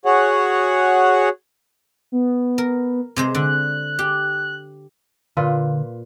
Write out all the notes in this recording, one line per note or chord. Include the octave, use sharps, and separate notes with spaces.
F#4 G#4 C#5 F#5
B3
A#4
C3 G#3 C5
D3 F#6
G4
A#2 D3 F4 B4